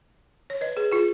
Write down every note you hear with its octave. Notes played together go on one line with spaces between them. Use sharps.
C#5
B4 D#5
G#4 B4
F4 G#4